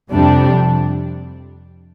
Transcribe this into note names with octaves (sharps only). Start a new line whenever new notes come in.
F2 C3 G3 D4